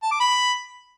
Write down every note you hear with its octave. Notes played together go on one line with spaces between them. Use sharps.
A5
D6
B5